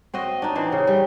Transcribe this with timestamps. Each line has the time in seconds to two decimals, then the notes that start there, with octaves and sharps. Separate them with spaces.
0.14 C4 F#4 D#5
0.42 D4 D#4
0.55 E3 C4 D#4 C5
0.72 C#3
0.87 G3